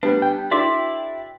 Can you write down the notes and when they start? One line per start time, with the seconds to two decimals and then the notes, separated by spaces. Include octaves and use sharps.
0.03 G3 B3 D4 B4
0.22 G5
0.51 D4 E4 F#4 G#4 D5 E5 D6